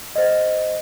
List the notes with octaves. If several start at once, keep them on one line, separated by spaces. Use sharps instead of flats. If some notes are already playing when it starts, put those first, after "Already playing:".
C5 D#5